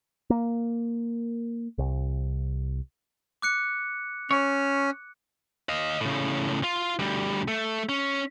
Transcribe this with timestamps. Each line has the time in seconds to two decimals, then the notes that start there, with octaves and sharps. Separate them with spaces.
0.30 A#3
1.78 C2
3.42 D6 F#6 C#7
4.31 C#4 C#5
5.69 D#5 F5
6.01 A2 C#3
6.63 F4
6.99 D2 G3
7.48 A3
7.89 C#4